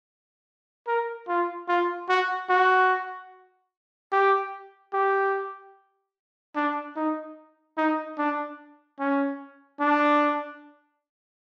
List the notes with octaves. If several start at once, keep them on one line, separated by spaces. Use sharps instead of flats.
A#4
F4
F4
F#4
F#4
G4
G4
D4
D#4
D#4
D4
C#4
D4